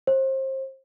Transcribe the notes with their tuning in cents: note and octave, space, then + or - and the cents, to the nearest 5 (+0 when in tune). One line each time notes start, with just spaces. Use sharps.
C5 +30